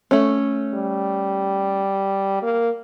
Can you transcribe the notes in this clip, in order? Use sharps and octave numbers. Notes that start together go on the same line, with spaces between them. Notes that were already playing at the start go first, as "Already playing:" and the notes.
A3 C#4
G3
A#3